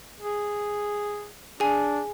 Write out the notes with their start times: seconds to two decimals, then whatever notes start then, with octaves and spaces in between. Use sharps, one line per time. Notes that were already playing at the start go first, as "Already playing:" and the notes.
0.20 G#4
1.60 D4 G#4 G#5